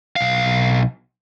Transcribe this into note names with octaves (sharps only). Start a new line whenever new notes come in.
B1 F5